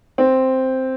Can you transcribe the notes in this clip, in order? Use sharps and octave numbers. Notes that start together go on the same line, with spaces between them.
C4